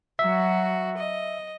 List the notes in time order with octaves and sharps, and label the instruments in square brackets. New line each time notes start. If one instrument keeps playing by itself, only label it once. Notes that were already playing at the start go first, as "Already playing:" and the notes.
[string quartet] F#3 F#4 [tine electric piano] E5
[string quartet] D#5